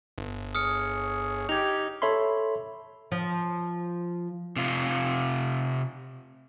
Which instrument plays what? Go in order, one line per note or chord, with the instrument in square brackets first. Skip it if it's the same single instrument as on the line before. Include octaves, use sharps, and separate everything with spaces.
[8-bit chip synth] G1
[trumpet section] G#4 C#5 [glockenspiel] D#6 F6 C#7
[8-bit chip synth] D#4 [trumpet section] G4 [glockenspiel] G#6 F7
[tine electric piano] A4 C#5 E5 B5 C6
[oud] F3
[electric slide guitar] C3 F4